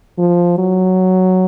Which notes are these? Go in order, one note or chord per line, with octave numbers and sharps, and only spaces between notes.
F3
F#3